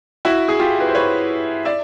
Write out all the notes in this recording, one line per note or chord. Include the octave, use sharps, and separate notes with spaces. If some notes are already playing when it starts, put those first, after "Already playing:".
E4 F#4
G#4
F4 G4
B4
C5
B4 C#5
D5 E5